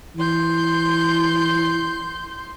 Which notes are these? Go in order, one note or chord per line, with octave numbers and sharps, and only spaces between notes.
E3 C6 G6